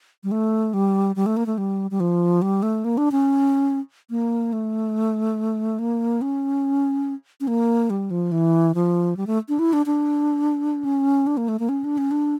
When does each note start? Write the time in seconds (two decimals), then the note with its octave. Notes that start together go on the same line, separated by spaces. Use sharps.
0.24 G3
0.32 A3
0.74 G3
1.16 G3
1.26 A3
1.37 A#3
1.46 A3
1.58 G3
1.91 G3
2.00 F3
2.42 G3
2.63 A3
2.85 A#3
2.98 D4
3.12 C#4
4.10 A#3
4.53 A3
5.79 A#3
6.22 C#4
7.40 C#4
7.48 A#3
7.90 G3
8.11 F3
8.32 E3
8.75 F3
9.17 G3
9.27 A3
9.49 D4
9.59 E4
9.73 D4
9.86 D4
10.85 C#4
11.27 D4
11.37 A#3
11.48 A3
11.59 A#3
11.69 C#4
11.84 D4
11.98 C#4
12.11 D4